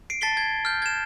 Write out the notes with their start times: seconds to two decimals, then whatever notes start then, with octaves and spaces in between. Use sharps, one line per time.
0.10 C7 D7
0.21 A5 A6 B6 C7 G7
0.37 G#6
0.65 F6 G6
0.82 G#6 E7